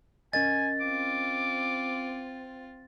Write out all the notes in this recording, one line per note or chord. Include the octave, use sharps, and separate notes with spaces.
C#4 A#4 D#5 G#5 A6
C4 F4 D6